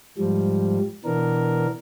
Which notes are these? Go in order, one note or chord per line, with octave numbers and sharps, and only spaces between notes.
G#2 F3 G3
B2 E3 B3 D4 A#4